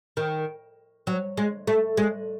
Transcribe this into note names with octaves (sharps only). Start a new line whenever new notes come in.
D#3
F#3
G#3
A3
G#3